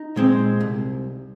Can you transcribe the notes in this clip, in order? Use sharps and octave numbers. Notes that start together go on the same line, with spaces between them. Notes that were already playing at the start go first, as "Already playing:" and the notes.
Already playing: D#4
A#2 G#3 C4
C2